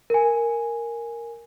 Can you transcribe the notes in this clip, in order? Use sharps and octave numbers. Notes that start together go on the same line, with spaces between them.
A#4 G#5